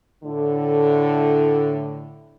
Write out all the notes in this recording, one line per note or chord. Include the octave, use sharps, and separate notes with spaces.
A2 D3